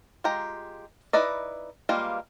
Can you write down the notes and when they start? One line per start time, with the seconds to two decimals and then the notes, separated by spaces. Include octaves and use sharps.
0.24 G#3 F4 G4 A#5
1.13 D#4 E4 B4 D5 D#5
1.89 G3 G#3 A#3 F4 B4